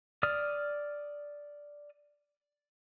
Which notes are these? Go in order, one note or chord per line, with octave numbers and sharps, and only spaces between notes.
D5 D#6 F6